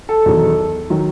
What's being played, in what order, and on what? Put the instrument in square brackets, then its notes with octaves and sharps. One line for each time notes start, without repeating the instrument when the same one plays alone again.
[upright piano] A4
E1 E2 D#3 F#3
D#3 F#3